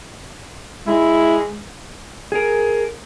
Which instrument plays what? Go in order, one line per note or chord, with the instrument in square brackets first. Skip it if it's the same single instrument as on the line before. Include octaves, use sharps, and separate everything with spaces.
[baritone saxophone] G#3 [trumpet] E4
[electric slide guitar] G#4 A#4